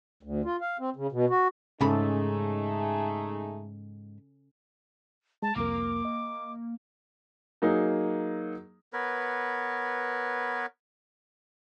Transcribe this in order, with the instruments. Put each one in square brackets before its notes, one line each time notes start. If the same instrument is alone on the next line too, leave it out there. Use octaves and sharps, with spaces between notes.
[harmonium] D2
F4
F5
C4
C#3
B2
F#4
[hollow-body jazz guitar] G#2 B5 [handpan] C#3 C#4 A4 [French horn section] A3 D#4 G#4
[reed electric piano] G#3 [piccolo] A5
[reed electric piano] C2 F2 A#4 [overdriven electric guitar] A#3 F5 [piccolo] D6
[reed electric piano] D#5
[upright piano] F#3 A#3 D#4 G#4
[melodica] B3 A#4 B4 C#5